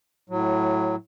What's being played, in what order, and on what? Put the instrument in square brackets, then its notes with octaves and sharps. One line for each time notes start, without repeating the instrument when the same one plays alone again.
[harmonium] A2 F#3